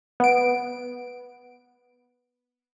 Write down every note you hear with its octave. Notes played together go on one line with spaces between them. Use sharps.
B3 D7